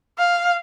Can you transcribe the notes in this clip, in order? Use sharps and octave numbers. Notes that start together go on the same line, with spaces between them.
F5